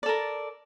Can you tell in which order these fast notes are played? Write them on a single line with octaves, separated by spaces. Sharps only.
D5 A4 A#4